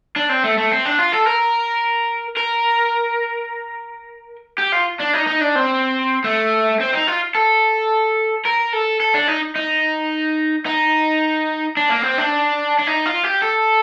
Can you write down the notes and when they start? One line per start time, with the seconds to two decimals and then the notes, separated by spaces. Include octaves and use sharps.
0.16 D4
0.29 C4
0.44 A3
0.58 A3
0.72 C4
0.85 D4
0.99 F4
1.13 A4
1.27 A#4
2.37 A#4
4.58 G4
4.72 F4
4.99 D4
5.13 D#4
5.27 D#4
5.41 D4
5.55 C4
6.24 A3
6.80 C4
6.93 D#4
7.07 F4
7.35 A4
8.45 A#4
8.73 A4
9.00 A4
9.15 D4
9.28 D#4
9.56 D#4
10.66 D#4
11.77 D4
11.90 A#3
12.04 C4
12.18 D4
12.78 D4
12.87 D#4
13.06 F4
13.24 G4
13.42 A4